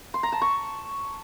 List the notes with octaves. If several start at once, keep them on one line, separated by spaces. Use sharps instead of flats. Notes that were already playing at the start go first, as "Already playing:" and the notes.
C6
A#5
A5
C#6